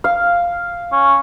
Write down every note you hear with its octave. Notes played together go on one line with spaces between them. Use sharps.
F5
C#4